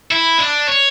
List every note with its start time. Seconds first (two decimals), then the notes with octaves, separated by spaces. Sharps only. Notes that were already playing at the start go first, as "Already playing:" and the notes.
0.11 E4
0.38 D4
0.67 C#5